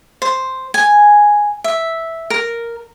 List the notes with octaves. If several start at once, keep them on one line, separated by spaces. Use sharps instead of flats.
C5
G#5
E5
A#4